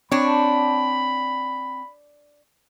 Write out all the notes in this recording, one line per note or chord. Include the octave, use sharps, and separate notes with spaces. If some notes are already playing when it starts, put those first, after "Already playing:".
C4 D4 C#5 B5